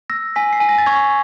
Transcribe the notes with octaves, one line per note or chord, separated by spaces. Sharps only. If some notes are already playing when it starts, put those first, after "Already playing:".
E6 A#6
G#5 B6
C7
G#5
A#6
A6
C#6 G#6